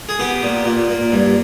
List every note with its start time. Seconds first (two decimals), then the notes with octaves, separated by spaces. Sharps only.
0.09 G#4
0.19 B3 G4
0.43 A#2
0.65 A#2
0.89 A#2
1.12 G2